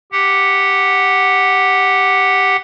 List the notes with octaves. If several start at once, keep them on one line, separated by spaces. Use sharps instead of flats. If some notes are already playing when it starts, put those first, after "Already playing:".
G4 F#5